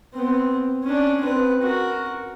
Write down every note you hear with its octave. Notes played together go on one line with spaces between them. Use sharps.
B3 C4
C#4 D4
C4 B4
F#4 A#4